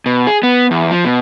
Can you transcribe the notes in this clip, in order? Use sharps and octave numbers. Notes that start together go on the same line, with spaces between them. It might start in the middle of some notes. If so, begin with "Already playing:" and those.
B2
G#4
B3
E2
F3
B2